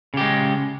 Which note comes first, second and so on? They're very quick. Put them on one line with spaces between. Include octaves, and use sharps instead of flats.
C#3 G4 G#3